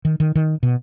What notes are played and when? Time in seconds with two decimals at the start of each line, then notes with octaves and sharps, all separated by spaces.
0.05 D#3
0.20 D#3
0.35 D#3
0.63 B2